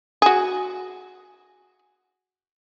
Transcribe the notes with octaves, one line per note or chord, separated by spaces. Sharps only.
F#4 G#4